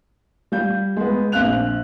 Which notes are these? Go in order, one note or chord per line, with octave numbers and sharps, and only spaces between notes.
G3 F5 G6
G#3 B3
A#1 C4 F5 F#6 F7